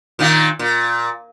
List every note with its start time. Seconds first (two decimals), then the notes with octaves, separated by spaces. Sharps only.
0.19 A#2 D#3 A#3
0.59 A#2